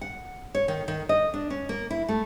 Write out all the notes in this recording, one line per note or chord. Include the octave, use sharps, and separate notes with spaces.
F#5
C#5
D#3
D#3
D#5
D4
C#4
A#3
E4
A3